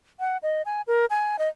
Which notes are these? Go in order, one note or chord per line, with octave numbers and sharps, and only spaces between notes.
F#5
D#5
G#5
A#4
G#5
D#5